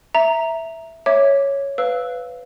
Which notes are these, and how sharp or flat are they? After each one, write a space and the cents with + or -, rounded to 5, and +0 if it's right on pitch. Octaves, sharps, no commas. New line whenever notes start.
E5 +0 A#5 +0
C#5 +0 E5 -5 D6 +0
B4 +20 F5 +0 E6 -10